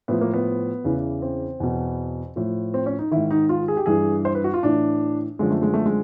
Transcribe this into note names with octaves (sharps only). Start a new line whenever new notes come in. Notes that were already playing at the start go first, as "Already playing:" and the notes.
A2 F3 B3
A#3
B3
E2 C#3 E3
C4
E2 B2
A2 F3
C4
C#4
D#4
G#2 D#3 E4
D#4
F4
G#4
G4
G2 E3 G#4
C5
B4
F#4
F4
A2 E3 D4
F#2 D3 F3 G#3
A3
G#3
A3
G#3